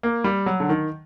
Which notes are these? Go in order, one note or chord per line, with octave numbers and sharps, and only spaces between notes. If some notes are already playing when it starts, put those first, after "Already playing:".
A#3
G3
F#3
D3
D#3